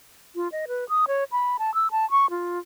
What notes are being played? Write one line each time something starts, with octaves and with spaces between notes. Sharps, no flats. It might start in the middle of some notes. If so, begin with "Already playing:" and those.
F4
D#5
B4
D#6
C#5
B5
A5
E6
A5
C#6
F4